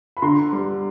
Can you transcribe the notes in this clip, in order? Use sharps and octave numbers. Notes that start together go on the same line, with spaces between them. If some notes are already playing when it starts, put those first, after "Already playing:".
B5
D3 A#5 C6
G3